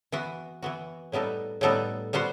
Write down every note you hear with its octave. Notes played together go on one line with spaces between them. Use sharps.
E3 B3 F#4
E3 B3 F#4
A2 G3 B3 D#4 A4
A2 G3 B3 D#4 A4
G3 B3 F#4 C5